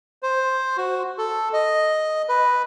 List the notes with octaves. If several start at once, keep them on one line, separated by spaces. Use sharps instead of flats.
C5
F#4
A4
D#5
B4